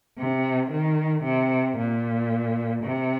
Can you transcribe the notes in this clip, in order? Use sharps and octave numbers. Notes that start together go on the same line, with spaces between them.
C3
D#3
C3
A#2
C3